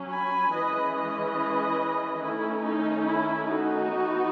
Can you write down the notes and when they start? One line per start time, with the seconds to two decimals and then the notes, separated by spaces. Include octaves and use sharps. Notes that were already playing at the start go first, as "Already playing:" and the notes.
Already playing: F#3 C#4
0.09 G#5 B5
0.52 E3 G#3 C#4 B4 D#5
0.94 B4 D#5
2.21 D#3 A3 C#4 E4
2.63 D#4
3.06 E4
3.49 D#4 F#4
3.91 E3 B3